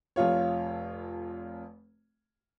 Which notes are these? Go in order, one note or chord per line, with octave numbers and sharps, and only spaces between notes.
F1 F2 F4 C#5